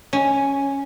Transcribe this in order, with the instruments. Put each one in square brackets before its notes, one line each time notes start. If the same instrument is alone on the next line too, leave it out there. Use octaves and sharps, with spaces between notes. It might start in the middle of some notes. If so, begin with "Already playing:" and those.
[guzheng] C#4